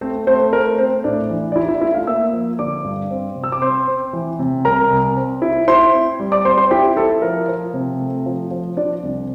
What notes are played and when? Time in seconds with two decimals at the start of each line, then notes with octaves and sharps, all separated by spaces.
0.01 A3 C4 C5
0.27 A3 C4 C5
0.52 A3 A#4
0.78 A3 C4 C5
1.04 A2 D4 D5
1.30 E3
1.52 D5
1.56 D4 E4 E5
1.68 E4 E5
1.81 A3 E4 E5
1.94 F4 F5
2.07 A#3 E5 E6
2.33 F3
2.59 D3 D5 D6
2.84 G2
3.11 C4
3.36 C3
3.44 E6
3.52 D6
3.62 C4 C5 C6
3.88 C4
4.13 E3
4.39 C3
4.65 C2 A#4 A#5
4.91 C2
5.16 C4
5.42 E4
5.68 E4 C5 C6
5.94 C4
6.20 G3
6.32 D5 D6
6.45 C4 C5 C6
6.58 C5 C6
6.71 E4 G4 G5
6.96 E4 A4
7.22 F3 A#4
7.48 F3
7.74 C3
8.00 A3
8.26 F3
8.51 F3
8.77 F3 D4 D5
9.03 C2